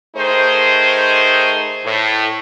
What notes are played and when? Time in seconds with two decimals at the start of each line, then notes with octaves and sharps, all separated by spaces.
0.16 D#3 A3 D#4 G#4 C5
1.85 A2